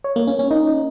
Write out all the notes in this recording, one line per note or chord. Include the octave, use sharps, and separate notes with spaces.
C#5
A#3
C#4
C#4
D#4